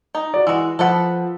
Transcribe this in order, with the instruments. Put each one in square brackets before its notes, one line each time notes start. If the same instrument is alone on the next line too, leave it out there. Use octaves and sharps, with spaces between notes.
[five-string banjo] D#4
[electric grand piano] F#4 D5
[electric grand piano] E3 E6 [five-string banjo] G#3 F#4
[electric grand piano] F3 [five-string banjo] A4 B4 F#5